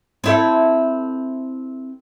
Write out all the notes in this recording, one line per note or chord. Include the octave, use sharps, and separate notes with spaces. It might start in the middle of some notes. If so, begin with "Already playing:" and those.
C4 E4 A4